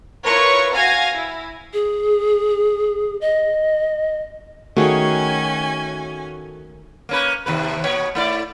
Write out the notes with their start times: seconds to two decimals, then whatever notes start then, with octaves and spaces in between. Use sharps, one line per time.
0.25 E4 F4 A#4 B4 C#5 C#6
0.74 F#4 F5 G#5 G#6 A#6
1.14 E4
1.74 G#4
3.21 D#5
4.77 D#3 A3 C#4 F#4 G#4 C#5 G#5
7.09 A#3 C#4 B4
7.46 D#2 C3 B4
7.84 B2 A#3 C#5
8.15 A3 E4 D5